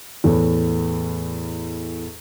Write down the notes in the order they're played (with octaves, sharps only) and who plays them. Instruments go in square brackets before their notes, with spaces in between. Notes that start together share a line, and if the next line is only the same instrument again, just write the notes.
[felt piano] E2 A2 A3